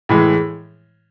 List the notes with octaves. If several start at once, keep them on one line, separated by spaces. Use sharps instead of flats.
A2 E3 G#3